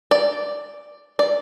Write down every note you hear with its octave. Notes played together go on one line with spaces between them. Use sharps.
D5
D5